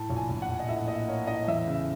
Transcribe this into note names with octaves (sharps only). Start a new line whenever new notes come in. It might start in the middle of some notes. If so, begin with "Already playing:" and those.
Already playing: A2 A5
A#1
G#5
A#1
F#5
A#1
D#5
A2 E5
A#3 D#5
A#3 C#5
A2 D#5
E2 E5
C#3